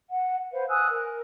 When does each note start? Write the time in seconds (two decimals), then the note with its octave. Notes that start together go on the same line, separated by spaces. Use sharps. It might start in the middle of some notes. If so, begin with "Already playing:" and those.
0.09 F#5
0.52 B4 C5 F5
0.68 G#5 D#6 E6 F#6
0.88 A#4